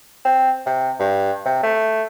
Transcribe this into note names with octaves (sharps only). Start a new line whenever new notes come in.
C4
C3
G2
C3
A3